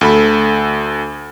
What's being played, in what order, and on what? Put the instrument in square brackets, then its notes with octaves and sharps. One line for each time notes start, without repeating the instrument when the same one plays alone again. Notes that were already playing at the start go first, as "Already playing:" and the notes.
[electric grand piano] D2 A4 B5